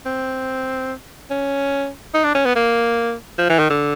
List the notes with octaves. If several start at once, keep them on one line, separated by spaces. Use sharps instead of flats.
C4
C#4
D#4
D4
C#4
B3
A#3
F3
E3
D#3
D3